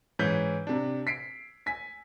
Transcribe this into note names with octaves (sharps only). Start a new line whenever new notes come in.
G#2 E3 C#4 G6 B6
C3 D4
B6 C7 D7
G#5 B6